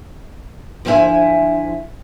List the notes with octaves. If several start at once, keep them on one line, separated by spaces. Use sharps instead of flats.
D2 F3 E4 D#5 E5 G#5